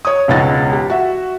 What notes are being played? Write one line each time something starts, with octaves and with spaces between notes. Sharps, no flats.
C#5 D#6
E1 C#2 B3 D#4 F5 A6
G4
F#4 E5